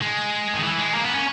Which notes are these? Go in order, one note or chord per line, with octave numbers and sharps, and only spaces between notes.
G#3
D#3
E3
G#3
A#3
B3
C#4